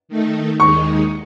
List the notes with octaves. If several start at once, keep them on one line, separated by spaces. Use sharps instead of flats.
D#3 A3 D#4
D#2 D#3 G#3 D#4 C#6